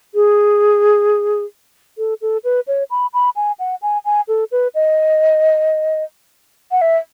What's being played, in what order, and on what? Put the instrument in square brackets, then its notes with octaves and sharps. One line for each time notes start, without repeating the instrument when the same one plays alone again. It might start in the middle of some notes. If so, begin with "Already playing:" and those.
[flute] G#4
A4
A4
B4
C#5
B5
B5
G#5
F#5
G#5
G#5
A4
B4
D#5
F#5
E5